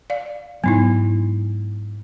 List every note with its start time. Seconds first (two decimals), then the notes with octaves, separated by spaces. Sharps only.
0.10 D5 F5
0.64 G#2 F#3 B3 D#4 E4